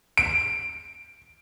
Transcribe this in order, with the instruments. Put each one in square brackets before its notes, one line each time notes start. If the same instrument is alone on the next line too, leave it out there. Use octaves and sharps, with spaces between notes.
[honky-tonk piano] D7